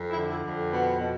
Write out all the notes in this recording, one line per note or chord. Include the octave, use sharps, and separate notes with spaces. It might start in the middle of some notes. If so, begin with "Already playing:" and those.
Already playing: F2
E4
D3
E4
F2
B2 B3
B2